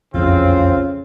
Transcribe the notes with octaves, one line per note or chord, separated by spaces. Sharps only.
F#1 B1 F2 C#3 E3 A3 C4 F4